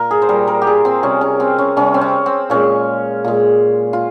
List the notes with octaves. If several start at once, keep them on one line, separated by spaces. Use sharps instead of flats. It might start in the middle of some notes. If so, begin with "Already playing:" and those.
Already playing: A#2 A#4
G#4
C5
A#2 G3 A#4
A#4
G4
G#4
C4
C3 G3 C#4
C#4
C4
C#4
C3 G3 C#4
C4
C#4
C4
A#2 G#3 C#4
A#2 G#3
F4